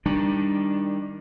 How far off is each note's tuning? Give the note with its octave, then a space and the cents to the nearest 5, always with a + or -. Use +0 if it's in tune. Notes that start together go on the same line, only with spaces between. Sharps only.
D#3 +10 G3 +15 D4 +0